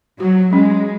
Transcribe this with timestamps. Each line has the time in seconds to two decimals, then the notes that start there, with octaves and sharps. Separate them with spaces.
0.20 F#3 F#4
0.53 G#3 C#4